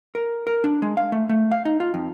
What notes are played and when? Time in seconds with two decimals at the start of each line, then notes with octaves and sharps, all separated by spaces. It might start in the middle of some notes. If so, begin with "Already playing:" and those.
0.15 A#4
0.47 A#4
0.64 D4
0.82 G#3
0.97 F5
1.12 A3
1.29 A3
1.52 F5
1.65 D#4
1.80 F4
1.94 F2